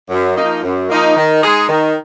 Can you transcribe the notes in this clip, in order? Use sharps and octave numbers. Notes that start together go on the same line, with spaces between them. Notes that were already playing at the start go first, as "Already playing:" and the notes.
F#2
F3 A#3 D#4
F#2
F3 A#3 D#4
D#3
G#3 D#4 G#4
D#3